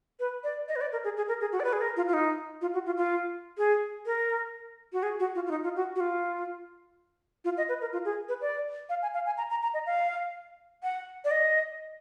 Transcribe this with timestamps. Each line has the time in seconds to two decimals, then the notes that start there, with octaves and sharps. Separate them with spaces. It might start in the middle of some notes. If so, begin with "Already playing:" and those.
0.20 B4
0.44 D5
0.68 D#5
0.76 B4
0.81 D5
0.92 A#4
1.04 G#4
1.17 G#4
1.28 A#4
1.41 G#4
1.52 F#4
1.60 D5
1.64 B4
1.73 G#4
1.81 A#4
1.97 F4
2.08 F4
2.14 D#4
2.61 F4
2.74 F#4
2.86 F4
2.97 F4
3.58 G#4
4.06 A#4
4.93 F#4
5.03 G#4
5.20 F#4
5.35 F4
5.46 F4
5.51 D#4
5.64 F4
5.76 F#4
5.96 F#4
6.00 F4
7.45 F4
7.57 D#5
7.69 B4
7.81 A#4
7.93 F4
8.05 G#4
8.29 B4
8.42 D5
8.89 F5
9.02 G#5
9.14 F5
9.26 G#5
9.38 A#5
9.50 A#5
9.63 A#5
9.74 D#5
9.86 F5
10.83 F#5
11.24 D5
11.31 D#5